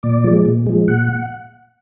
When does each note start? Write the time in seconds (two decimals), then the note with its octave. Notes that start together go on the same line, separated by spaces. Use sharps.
0.03 A#2 D5
0.24 F3 G#3
0.46 A#2
0.67 F3 G#3
0.88 A#2 F#5